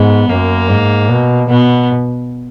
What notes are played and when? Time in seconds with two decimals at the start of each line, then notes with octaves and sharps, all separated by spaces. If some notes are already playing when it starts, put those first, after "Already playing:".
Already playing: G#2 B3
0.29 F#2 A#3
0.69 G#2
1.09 B2
1.49 B2 B3